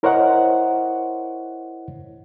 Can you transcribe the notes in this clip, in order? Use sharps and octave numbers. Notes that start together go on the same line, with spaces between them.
E4 A#4 C5 C#5 D#5 F#5